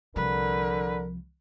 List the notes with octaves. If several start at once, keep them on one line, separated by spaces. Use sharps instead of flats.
C2 D3 F3 A#4 B4